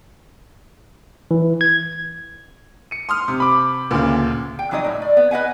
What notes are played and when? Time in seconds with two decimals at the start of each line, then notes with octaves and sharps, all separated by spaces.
1.31 E3
1.61 G#6
2.91 C#7 D#7
3.09 C6 D#6 F6
3.28 C3
3.40 B5 D6
3.91 D2 A#2 C#3
4.59 G5
4.71 E3 F#3 D#4 D5 D#5
4.84 A2 A3
5.02 D5
5.17 B3
5.31 B4 D#5 F#5 G#5